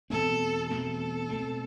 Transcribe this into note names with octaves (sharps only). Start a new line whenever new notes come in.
E2 B2 A3 C4 A4
E2 B2 A3 C4 A4
B2 A3 C4